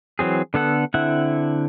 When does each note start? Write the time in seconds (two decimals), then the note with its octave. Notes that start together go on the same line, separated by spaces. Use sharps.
0.19 E3 F#3 C4 G#4
0.54 D3 B3 A4 F#5
0.94 D3 C4 E4 E5 F#5